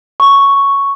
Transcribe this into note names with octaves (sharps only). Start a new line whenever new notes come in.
C#6